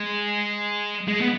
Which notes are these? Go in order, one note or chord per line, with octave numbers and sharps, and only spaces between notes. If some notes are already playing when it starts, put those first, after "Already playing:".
Already playing: G#3
G#3
B3